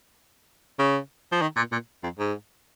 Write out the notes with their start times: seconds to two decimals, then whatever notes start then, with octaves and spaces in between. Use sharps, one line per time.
0.79 C#3
1.32 F3
1.42 D#3
1.57 A#2
1.72 A#2
2.03 F2
2.19 G#2